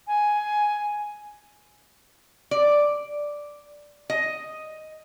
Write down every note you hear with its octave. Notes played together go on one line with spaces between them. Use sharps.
G#5
D5
D#5